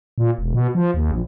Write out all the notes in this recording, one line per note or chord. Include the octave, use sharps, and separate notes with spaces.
A#2
E1
B2
F3
D#2
A#1